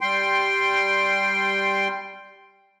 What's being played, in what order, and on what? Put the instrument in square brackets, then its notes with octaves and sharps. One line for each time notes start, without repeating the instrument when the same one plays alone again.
[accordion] G3 G5 C6